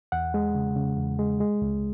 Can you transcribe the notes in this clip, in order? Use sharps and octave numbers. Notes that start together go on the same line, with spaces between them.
E2 F#5
G#3
C#3
C#3
E2
G#3
G#3
C#2